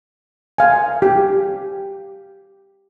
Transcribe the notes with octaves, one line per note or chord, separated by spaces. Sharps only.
F5 G#5
G4